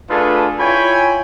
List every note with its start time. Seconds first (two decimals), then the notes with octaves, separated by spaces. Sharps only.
0.10 A3 D4 F4 G#4 A4 B4
0.60 E4 F4 C#5 G5 G#5 B5